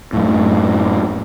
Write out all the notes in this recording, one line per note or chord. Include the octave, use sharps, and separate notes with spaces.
F#2 A2